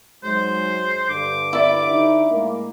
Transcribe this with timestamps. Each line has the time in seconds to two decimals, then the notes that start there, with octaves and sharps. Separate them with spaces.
0.23 G#2 F#3 G#3 C5
1.09 G2 D3 D6
1.53 E4 D5
1.90 D3 D#4
2.30 A2 G#3 A#3